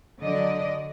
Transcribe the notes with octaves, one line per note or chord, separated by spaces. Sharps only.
D3 F#3 D5 D#5